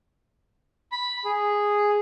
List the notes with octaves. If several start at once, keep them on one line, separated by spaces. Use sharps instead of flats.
B5
G#4